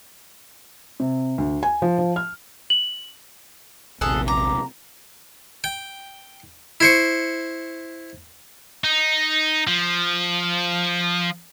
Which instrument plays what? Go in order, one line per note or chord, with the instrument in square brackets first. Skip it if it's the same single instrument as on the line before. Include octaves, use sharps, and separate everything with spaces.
[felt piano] C3
D2
G#5
F3
F3
F6
[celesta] F#7
[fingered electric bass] D#1 C3 [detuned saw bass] A#1 [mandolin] G#4 A4 F#5
[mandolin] A#5 [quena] D6
[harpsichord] G5
E4 C5 C#6
[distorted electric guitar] D#4
F3